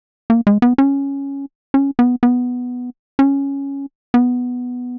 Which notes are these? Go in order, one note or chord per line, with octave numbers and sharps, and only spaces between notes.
A#3
G#3
B3
C#4
C#4
B3
B3
C#4
B3